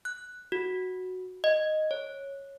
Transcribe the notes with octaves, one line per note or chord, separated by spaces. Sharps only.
F#6
F#4
D#5
C#5